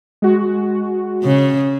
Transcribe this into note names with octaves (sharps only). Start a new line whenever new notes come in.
G#3 F#4
C#3